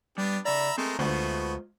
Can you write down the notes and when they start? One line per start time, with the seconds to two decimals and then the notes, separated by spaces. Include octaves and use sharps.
0.18 G3 B3 D4 G4
0.45 C#3 D5 E5 A#5 B5
0.78 G#3 A3 C4 A#4
0.99 D2 G#3 A3 B3 F4 F#4 C5